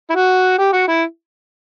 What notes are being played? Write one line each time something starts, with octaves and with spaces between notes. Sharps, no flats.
E4
F#4
G4
F#4
E4